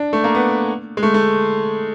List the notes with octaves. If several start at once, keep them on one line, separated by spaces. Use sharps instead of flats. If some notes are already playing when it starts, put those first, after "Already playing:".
Already playing: D4
A3
A#3
B3
G#3
A3
A3